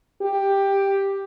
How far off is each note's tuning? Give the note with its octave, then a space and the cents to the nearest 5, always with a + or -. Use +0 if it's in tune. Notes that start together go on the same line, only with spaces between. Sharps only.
G4 +5